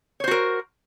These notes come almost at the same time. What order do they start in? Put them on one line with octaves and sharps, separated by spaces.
C#5 C5 F#4 A#4